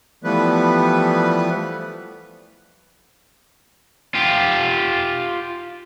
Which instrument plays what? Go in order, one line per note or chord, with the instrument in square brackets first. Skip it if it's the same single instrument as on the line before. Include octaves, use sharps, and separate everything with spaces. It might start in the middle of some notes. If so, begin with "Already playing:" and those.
[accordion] E3 F3 G3 A3 B3 B4
[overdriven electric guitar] F4 G4